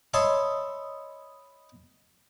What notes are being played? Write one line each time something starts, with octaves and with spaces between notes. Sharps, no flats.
C#5 D#5 E5 A5 B5 C6